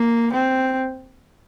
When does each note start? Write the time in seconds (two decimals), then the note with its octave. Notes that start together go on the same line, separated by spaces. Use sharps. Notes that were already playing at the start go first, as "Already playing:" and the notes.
Already playing: A#3
0.33 C4